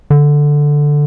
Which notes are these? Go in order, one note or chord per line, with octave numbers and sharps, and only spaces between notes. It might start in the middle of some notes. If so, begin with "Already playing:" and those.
D3